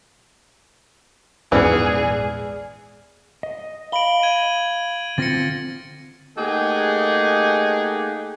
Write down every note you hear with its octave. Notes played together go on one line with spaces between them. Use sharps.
A#1 E2 G#2 E3 B3 G#4 D5 F6
D#5
F5 B5 D7 F#7 G7
G#6 D#7
D3 C4 F4 A6 A#6 C#7
A3 A#3 D#4 G4 G#4 F#5